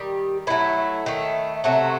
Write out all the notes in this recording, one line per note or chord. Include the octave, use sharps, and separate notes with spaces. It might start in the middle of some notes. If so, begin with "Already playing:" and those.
Already playing: D#3 G3 G4
D#3 F#3 A3 E4
D#3 A3
C3 F#3 A3 F#4